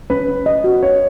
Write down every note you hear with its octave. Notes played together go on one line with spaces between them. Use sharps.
C#4 B4
C#4
D#5
F#4
C#4 C#5